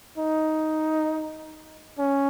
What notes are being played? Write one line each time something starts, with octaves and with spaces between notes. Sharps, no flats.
D#4
C#4